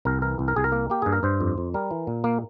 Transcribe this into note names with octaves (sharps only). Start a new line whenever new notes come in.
C2 A#4
E3 A#4
C2
A#4
C2 G#4
A#4
A#3
A#3 G4
G2 G#4
A#4
G2 C5
F2
F2
G3 A#4
E3
A#2
A#3